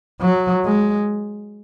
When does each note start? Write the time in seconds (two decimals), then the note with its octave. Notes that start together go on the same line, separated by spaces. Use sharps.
0.21 F#3
0.65 G#3